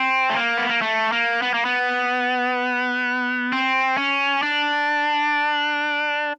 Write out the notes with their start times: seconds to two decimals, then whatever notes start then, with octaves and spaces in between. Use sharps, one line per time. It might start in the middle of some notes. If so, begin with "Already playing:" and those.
Already playing: C4
0.29 A3
0.36 A#3
0.57 B3
0.69 A#3
0.82 A3
1.12 A#3
1.42 B3
1.54 A#3
1.65 B3
3.52 C4
3.97 C#4
4.43 D4